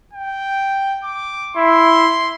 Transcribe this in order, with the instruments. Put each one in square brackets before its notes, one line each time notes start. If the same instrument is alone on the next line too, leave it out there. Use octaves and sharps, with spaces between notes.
[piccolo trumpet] G5
D6
[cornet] E4 [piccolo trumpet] C6